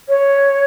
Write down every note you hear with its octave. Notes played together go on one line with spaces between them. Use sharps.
C#5